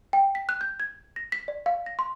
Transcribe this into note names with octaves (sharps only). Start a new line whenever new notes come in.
G5
B6
F#6
G6
G#6
A#6
B6
D5
F5
A#6
C6